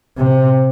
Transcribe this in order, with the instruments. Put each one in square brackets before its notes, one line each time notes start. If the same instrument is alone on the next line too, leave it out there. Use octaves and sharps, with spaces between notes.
[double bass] C3